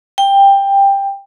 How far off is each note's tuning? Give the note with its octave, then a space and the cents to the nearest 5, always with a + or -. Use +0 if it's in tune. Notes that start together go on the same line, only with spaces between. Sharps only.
G5 +15